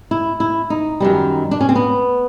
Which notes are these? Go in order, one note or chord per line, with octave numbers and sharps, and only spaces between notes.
E4
E4
D#4
F#2 D#3 G3
D4
C#4
C4
B3